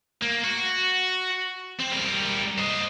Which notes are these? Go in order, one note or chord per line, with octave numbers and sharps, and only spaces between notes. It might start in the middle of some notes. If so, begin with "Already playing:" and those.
A#3
F#4
C4
G3 A#4
C5 D#5